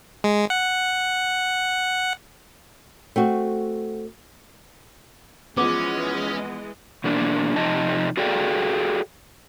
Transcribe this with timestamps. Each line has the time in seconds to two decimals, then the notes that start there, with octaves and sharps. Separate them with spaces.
0.24 G#3
0.50 F#5
3.16 A3 C4 F#4
5.57 E3 F3 G#3 B3 C#4 D#5 D6
7.04 B2 E3 A#3 D4
7.56 C3 F3 D#4 D#5 A5
8.17 F#4 G#4 A4 D5 F5 G5